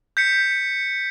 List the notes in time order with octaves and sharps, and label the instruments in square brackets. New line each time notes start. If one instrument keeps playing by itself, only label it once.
[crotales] G6 B6 C#7